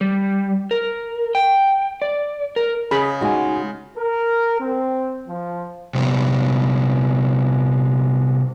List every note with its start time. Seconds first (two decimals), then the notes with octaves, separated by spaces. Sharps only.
0.01 G3
0.71 A#4
1.35 G5
2.02 D5
2.56 A#4
2.91 C#3 G#4 B5
3.21 G#3 D#4 F#4 G#5
3.97 A#4
4.60 C4
5.27 F3
5.95 C3 G3 B3